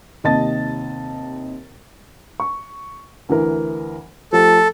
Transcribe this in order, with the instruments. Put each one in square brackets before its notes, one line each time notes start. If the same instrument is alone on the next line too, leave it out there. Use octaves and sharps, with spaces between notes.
[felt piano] D#2 C3 D#5 A5 A6
[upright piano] C#6
D2 E3 A#4
[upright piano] F3 A3 G4 [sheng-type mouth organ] A4